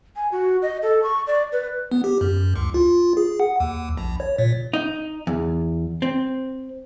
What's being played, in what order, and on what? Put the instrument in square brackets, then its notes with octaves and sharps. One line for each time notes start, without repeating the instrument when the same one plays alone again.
[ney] G#5
F#4
D#5
A4
C#6
D5
B4
[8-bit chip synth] B3
G4
F#2
C#2
F4
G#4
F#5
D#2
A#1
C#5
A#2
[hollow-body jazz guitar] D#4
E2
C4